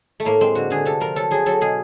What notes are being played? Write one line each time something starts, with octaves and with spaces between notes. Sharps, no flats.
A3
A2 A#3
G#3 C4
D3 F#4
D3 G#4
C3 A4
F3 A#4
F#3 A4
F#3 G#4
F#3 A4
B2 G#4